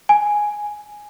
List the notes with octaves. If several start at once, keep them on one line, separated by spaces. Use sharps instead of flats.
G#5